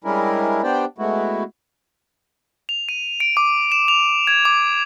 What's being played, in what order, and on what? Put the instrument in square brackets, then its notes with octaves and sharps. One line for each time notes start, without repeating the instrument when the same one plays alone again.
[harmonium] G3 G#3 C#4 D4 E4 A#4
B3 D4 G4 C5 D5 G5
G#3 A3 B3 E4 F#4
[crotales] F7
D#7
D7
D6
E7
F7
G#6
D6